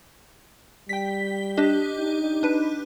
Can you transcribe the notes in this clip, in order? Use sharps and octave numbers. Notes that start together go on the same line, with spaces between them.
G3 G5 B6
D4 G4 D#5
D#4
D4 B4